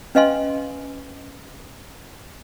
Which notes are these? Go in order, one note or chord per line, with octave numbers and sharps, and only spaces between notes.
C#4 B4 D#5 F5 G#5 C6